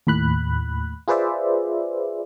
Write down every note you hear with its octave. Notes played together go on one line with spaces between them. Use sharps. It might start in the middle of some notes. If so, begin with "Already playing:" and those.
D#2 A2 B5 F#6
F4 G#4 B4 C5 D5 E5